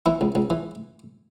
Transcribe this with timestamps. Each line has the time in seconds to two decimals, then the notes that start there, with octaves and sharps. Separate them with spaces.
0.06 E3 E4
0.21 C#2
0.35 C#2
0.50 E3